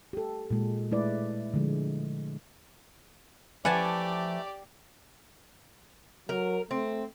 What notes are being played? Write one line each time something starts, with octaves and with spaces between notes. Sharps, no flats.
G4 A4
A#2 G#3
G#3 A3 E4 B4 D5
D3 F3 G#3
E3 F3 A3 G4 D5 F#5 G#5 A5
F#3 A#4
A3 C4